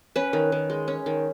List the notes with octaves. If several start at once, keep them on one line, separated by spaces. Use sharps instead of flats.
C#4 B4
D#3
D#3
G#3
C#4
D#3